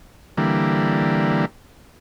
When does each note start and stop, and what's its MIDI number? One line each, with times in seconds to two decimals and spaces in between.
0.37 1.45 50
0.37 1.45 52
0.37 1.45 55
0.37 1.45 58